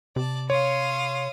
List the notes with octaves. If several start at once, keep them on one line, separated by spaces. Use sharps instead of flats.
C3 D5 A5
C#5 F5 C6 D#6